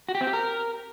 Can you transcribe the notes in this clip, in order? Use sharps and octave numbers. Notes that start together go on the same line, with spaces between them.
F#4
G4
C4
G4
A#4